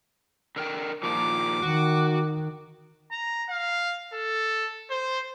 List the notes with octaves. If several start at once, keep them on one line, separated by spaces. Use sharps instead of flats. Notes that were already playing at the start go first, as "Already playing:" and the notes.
D3 A#4 G5
A#2 D#3 F3 D6
D#3 F#4
A#5
F5
A4
C5